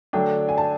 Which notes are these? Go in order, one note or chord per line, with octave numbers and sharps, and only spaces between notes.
D3 F#3 A3 D4 G5
G#5
A5